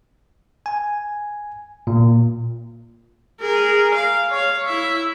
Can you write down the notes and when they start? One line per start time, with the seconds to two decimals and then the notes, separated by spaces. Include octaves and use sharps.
0.66 G#5
1.87 A#2
3.41 G#4 A#4
3.94 F5
4.31 C#5 F5
4.66 E4 E5